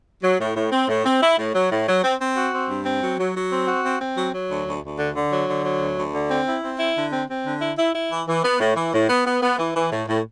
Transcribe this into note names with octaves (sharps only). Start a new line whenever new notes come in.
F#3
A2
A2
C4
A2
C4
E4
A2
F#3
A2
F#3
C4
C4
F#4
C4
G2
C4
F#3
F#3
F#3
C4
F#4
C4
C4
F#3
F#3
D2
D2
D2
D3
D3
F#3
D3
F#3
D2
D2
D3
C4
E4
C4
E4
D3
C4
C4
D3
E4
E4
E4
E3
E3
B3
A2
E3
A2
B3
B3
B3
E3
E3
A2
A2